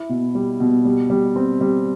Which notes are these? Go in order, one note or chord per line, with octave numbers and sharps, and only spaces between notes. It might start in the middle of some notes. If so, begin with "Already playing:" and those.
Already playing: E4
B2
G3
B2
G3
G3
C4
G3